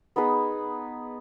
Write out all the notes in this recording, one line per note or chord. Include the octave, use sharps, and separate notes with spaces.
B3 D#4 G#4 B4